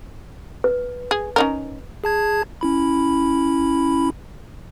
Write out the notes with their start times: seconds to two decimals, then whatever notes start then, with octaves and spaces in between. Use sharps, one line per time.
0.64 B4
1.11 G#4
1.36 C#4 D#4 A#4
2.04 G#4 A5 G#6
2.61 C#4 E4 B5